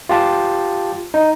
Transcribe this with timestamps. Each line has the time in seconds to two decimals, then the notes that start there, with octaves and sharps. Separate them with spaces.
0.09 F4 G4 A5
1.14 D#4